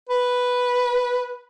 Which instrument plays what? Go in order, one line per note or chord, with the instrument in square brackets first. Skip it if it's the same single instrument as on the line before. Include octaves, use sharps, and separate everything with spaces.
[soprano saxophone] B4